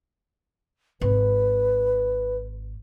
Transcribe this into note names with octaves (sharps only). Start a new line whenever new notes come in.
G#1 B4